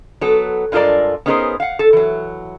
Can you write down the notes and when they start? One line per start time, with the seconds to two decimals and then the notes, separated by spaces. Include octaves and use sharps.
0.21 F#3 B3 A4
0.72 G2 G#3 F4 A4 A#4 D5
1.26 B3 C#4 D#4 G#4 A#4 C5
1.60 F5 F#5
1.79 A4
1.93 E3 F#3